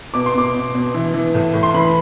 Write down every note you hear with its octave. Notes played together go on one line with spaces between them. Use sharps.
B2 D6
C6
B2 D6
B2
B2
E3
E3
A2
A2
C6
E3 B5